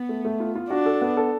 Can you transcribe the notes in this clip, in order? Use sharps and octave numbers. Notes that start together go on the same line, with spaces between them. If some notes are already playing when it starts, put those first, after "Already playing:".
Already playing: B3
A3
A3
F4
F4
D4 F#4
A4
B3
A4